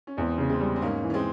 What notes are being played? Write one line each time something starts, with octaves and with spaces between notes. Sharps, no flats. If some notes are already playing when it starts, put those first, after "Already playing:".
C#4
E2 G#3 C4
C#3 C#4
G#3 C4
G3
C4
G#2 A#3 C#4
E3
C#4
G#3 C4